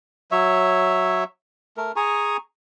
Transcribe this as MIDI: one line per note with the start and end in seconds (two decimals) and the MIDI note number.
0.32 1.24 54
0.32 1.24 73
0.32 1.24 76
1.77 1.92 57
1.77 1.92 70
1.96 2.37 68
1.96 2.37 80
1.96 2.37 82
1.96 2.37 85